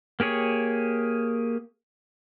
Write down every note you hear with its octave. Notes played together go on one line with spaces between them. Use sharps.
A#3 G4 G#4 C#5